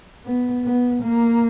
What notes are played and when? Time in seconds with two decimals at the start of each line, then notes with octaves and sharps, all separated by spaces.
0.25 B3
0.64 B3
1.03 A#3